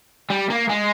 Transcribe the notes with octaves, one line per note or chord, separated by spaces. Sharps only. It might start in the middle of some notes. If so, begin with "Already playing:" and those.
G3
A#3
G#3